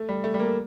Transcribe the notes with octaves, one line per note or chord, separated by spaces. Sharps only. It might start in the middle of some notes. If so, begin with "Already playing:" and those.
Already playing: A3
G3
A3
G3
A#3
A3